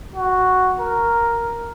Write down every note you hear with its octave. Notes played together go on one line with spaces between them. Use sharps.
F#4
A#4